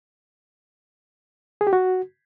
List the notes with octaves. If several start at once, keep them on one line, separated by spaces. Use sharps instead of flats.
G#4
G4
F#4